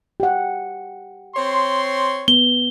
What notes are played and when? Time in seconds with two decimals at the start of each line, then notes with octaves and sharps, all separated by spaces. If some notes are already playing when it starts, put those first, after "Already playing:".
0.20 G4 F#5
1.35 C4 C#5 C6
2.28 B3 G7